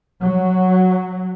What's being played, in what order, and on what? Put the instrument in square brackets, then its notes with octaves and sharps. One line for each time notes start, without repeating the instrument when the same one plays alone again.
[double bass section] F#3